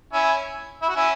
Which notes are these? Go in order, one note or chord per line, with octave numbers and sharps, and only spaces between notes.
C#4 E4
E4
F#4
C#4 E4